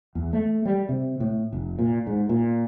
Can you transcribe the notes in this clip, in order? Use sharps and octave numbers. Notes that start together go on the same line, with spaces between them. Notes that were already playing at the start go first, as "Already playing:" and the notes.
E2
A3
G3
C3
A2
F1
A#2
G#2
A#2